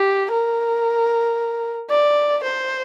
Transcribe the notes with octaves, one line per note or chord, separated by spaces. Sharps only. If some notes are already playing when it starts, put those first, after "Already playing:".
Already playing: G4
A#4
D5
C5